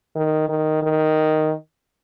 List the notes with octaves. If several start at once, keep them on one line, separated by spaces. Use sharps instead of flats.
D#3
D#3
D#3